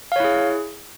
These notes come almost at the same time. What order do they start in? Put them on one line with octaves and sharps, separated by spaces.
F5 C#5 E4 G#4